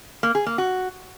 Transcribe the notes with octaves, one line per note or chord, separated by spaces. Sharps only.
A#3
G#4
A#3
F#4